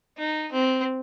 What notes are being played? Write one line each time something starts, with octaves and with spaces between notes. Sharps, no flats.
D#4
C4